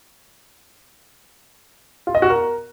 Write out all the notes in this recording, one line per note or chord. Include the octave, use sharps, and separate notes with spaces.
F4
D#5
F#4
A#4